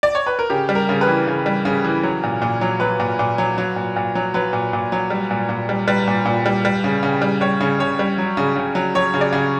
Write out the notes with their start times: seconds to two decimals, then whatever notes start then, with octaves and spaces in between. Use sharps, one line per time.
0.03 D5
0.15 C#5
0.27 B4
0.39 A#4
0.50 C#3 G4
0.69 G3
0.75 A#4
0.89 C#3
1.01 B4
1.07 E3
1.27 C#3
1.46 G3
1.65 C#3
1.84 E3
2.03 F#3
2.23 A#2
2.42 A#2
2.61 F#3
2.80 F#3 B4
3.00 A#2
3.19 A#2
3.38 F#3
3.58 F#3
3.76 A#2
3.96 A#2
4.15 F#3
4.34 F#3 B4
4.53 A#2
4.73 A#2
4.92 F#3
5.10 G3
5.31 A#2
5.49 A#2
5.69 G3
5.87 G3 B4
6.07 A#2
6.25 A#2
6.46 G3
6.65 G3
6.84 C#3
7.03 C#3
7.22 G3
7.41 G3 C#5
7.61 C#3
7.79 C#3 C#5
7.99 G3
8.18 F#3
8.37 C#3
8.56 C#3
8.75 F#3
8.95 F#3 C#5
9.14 C#3
9.21 D5
9.33 C#3